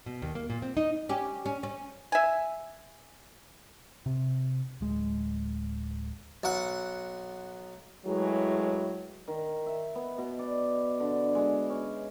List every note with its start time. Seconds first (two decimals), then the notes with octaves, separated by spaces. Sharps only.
0.06 B2
0.22 D#2
0.35 A#3
0.50 A#2
0.62 C4
0.77 D#4
1.09 C#4 G4
1.46 C#4
1.63 C#4
2.12 E5 G#5
4.06 C3
4.81 D1 G#3
6.44 B1 F#5
8.06 A2 E3 F#3 G#3
9.28 D#3
9.66 E5
9.95 B3
10.18 B2
10.39 D5
11.00 D3
11.35 G#3
11.70 C#4